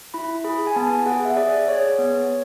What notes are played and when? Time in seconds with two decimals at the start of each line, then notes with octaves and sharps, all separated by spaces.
0.14 E4 B5
0.44 G#4 B5
0.67 G#5
0.76 B3 A5
1.06 G#4 F#5
1.25 E5
1.37 G#4 D5
1.67 G#4 C#5
1.98 B3